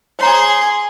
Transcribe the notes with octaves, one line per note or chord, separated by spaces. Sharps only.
G#4 C5 C#5 A#5 C6